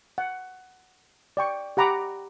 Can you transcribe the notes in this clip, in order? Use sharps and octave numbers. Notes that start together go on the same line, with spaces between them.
F#5
D5 G5 C#6
G4 F#5 A#5 B5 D6